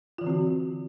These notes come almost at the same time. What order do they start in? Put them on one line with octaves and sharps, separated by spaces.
F4 E3 D3 C4 F#4